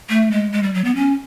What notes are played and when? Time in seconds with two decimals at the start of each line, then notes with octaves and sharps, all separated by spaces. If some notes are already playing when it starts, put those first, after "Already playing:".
0.09 A3
0.31 G#3
0.52 G#3
0.63 G3
0.74 F#3
0.84 B3
0.95 C#4